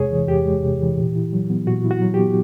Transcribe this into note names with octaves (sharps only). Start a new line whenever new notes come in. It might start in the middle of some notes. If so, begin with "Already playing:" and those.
Already playing: E2 C3 G#3 G#4 C#5
E3
E2 G4
G#3
C3
E3
A#2
E4
F#3
B3
A#2 F#4
E4
F#4
F#3
G4
B3